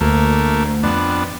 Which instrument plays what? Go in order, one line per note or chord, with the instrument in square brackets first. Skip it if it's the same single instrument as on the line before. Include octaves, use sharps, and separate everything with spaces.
[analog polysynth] D2 [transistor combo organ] A3 A#3
[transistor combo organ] F2 B3 D4